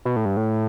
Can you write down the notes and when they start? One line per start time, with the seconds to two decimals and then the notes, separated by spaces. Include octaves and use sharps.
0.05 B2
0.16 A2
0.25 G2
0.37 A2